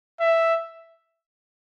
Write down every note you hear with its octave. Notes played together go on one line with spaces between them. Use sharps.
E5